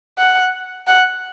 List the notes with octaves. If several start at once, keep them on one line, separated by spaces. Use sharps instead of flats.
F#5
F#5